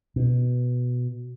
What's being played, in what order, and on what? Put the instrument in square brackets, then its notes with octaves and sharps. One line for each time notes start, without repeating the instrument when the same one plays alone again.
[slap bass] B2